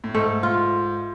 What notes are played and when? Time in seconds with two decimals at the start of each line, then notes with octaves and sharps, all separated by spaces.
0.04 A2
0.14 G#2 A3
0.43 F4